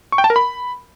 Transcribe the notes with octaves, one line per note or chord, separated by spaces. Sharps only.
C#6
G5
A5
A#4
B5